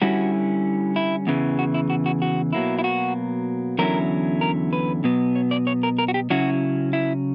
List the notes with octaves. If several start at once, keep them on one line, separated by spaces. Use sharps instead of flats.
D3 G3 C#4 E4 F#4
E4
E2 C#3 E3
F#4
E4
F#4
F#4
F#4
B2 F#3 A#3 E4
E4
F#4
E2 D3 F#3 C#4 E4 A#4
A#4
B4
B2 F#3 B3
C#5
D5
C#5
A#4
A#4
F#4
G4
C#3 F#3 C#4 E4 F#4
E4